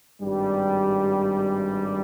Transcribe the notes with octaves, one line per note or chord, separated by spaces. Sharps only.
G#1 G2 G3